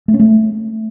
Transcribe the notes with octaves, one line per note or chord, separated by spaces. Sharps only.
A3
C#4
A3